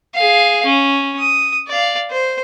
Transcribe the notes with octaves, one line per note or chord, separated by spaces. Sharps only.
G#4 F5
C#4
D#6
D5 F5
C5